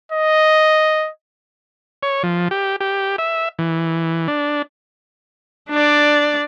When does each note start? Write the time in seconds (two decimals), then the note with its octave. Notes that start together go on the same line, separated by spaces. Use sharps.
0.12 D#5
2.03 C#5
2.23 F3
2.51 G4
2.81 G4
3.18 E5
3.59 E3
4.28 D4
5.70 D4 D5